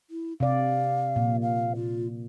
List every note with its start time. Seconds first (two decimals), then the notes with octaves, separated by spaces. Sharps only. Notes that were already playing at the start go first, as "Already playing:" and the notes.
0.10 E4
0.40 C3 D5 F5
1.16 A#2
1.42 F5
1.75 F4